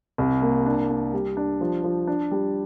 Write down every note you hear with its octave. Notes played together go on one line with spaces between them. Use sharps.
C2
A#3
D4
A#3
G3
D4
F3
F3
D4
G3